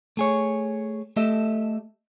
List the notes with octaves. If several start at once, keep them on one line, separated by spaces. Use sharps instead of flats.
A3 G#4 C#5
A3 G4 A4 D#5 E5